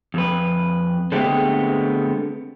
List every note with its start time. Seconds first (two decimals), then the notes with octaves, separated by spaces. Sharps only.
0.14 F2 B4
1.12 D3 G#3 A3 B3 C4 G4